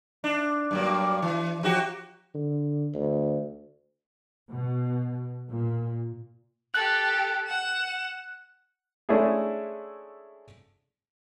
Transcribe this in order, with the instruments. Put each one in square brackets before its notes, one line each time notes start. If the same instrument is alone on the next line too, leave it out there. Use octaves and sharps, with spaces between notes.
[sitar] D4
G2 F#3 A#3
E3
F3 F#4 G4
[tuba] D3
D2
[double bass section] B2
A#2
[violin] G4 A4 [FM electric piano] F#6
[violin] F#5 E7
[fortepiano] G#3 A3 C#4 D4 E4 G#4